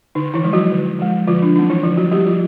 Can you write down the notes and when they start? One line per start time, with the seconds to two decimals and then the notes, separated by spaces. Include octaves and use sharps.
0.15 D3 D#4
0.34 E3 E4
0.43 F3 G#3
0.53 F#3 F#4
0.72 D3
0.99 F3 G#3
1.27 D3 F3 F4
1.42 D4
1.56 F#3 A3 C4 D#4
1.70 E3 E4
1.83 D3 F3 F4
1.97 F#3 F#4
2.11 F#3 G3 A3 C4 G4
2.27 F3 F4